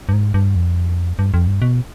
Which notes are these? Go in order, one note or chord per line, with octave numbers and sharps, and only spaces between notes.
G2
G#2
G2
F2
G2
F2
G2
B2